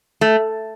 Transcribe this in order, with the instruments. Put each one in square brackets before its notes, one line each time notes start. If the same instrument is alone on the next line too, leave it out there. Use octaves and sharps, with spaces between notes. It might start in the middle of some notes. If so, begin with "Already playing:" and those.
[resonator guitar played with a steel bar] A3